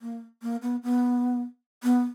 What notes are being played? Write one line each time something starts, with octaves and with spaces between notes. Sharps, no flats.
A#3
A#3
B3
B3
B3